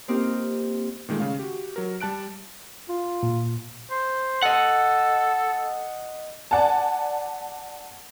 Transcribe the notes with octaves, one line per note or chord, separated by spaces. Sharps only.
A#3 C4 D#4 F4 G4 A#4
A#2 D#3 G#3 A3
C#3 F5
F#4 G4
F#3 A#4
G3 A5 F#6 D7
F4
A#2
C5
A4 D#5 F#5
D5 F#5 G#5 A5